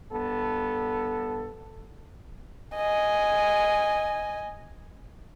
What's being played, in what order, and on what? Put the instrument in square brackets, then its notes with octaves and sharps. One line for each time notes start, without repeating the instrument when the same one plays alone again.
[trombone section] G2 B3 A4
[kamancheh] D#5 G#5